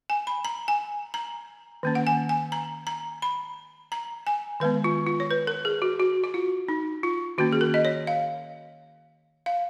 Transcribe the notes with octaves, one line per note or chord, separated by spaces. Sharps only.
G#5
B5
A#5
G#5
A#5
D#3 A#3 C#4
F#5
G#5
G#5
A#5
A#5
B5
A#5
G#5
D#3 G#3 B3 B4
F4
F4
C#5
B4
A#4
G#4
F#4
F#4
F#4
F4
D#4
F4
D#3 A#3 C#4 F#4
G#4
A#4
D#5
C#5
F5
F5